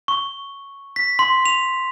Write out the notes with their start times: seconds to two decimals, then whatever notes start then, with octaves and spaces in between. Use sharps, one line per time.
0.08 C#6
0.96 B6
1.19 C6
1.46 F7